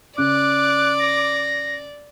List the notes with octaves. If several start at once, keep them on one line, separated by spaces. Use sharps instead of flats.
C#3 D5 D6 F#6
A#6